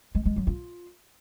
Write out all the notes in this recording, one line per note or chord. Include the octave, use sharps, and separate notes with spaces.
G#3
G#3
F#3
F4